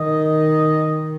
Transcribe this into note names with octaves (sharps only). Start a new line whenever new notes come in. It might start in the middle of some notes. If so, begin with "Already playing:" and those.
Already playing: D#3 D#5